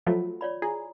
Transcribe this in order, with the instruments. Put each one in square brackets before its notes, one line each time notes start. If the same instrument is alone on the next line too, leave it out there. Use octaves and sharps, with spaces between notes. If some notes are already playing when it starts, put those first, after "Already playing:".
[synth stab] F3 F#3 A3 [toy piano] F4
[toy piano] C#5 D5 B5
[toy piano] E4 [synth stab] G#4